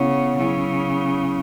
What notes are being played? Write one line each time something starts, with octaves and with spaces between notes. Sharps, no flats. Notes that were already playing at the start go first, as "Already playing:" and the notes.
Already playing: C#3 B3 E4 C#5 F#5
C#3 F#3 C#4 E4